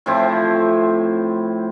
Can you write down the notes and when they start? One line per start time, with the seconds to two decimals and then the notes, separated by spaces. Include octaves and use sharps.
0.06 A2 F3 C4 E4